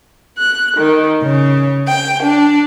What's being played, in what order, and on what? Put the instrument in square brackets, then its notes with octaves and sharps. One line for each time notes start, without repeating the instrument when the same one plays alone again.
[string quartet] F#6
D#3
C#3
G5
D4